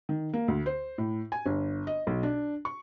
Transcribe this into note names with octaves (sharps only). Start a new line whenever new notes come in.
D#3
A#3
D2
C5
A2
G#5
G1
D#5
B1
D4
C#6